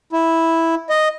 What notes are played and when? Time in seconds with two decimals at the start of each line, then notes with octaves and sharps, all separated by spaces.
0.13 E4
0.90 D#5